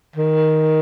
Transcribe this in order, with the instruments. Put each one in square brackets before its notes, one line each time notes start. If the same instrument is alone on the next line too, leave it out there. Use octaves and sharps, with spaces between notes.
[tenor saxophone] D#3